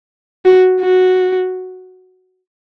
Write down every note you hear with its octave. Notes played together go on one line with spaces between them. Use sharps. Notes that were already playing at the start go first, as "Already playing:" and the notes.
F#4
F#4